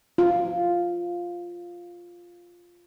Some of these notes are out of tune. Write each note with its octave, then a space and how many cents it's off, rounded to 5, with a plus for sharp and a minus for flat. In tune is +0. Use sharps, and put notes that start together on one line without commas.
F4 +0